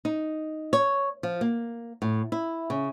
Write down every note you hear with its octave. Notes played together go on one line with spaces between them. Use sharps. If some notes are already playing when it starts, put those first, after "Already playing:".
D#4
C#5
F3
A#3
A2
E4
C#3